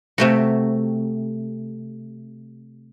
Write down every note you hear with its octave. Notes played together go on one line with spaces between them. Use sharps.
C3 A3 F#4